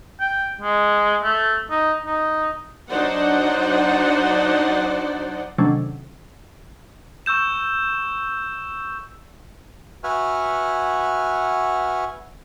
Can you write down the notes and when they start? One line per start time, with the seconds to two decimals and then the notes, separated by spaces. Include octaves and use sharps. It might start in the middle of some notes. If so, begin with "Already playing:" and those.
0.20 G5
0.61 G#3
1.23 A3
1.70 D#4
2.05 D#4
2.90 F#3 D4 D#4 C5 D5 F#5
5.58 C3 D#3 F#3 A3 C#4 D4
7.26 C#6 E6 G6 E7
10.04 F#4 B4 E5 F#5 G#5 F6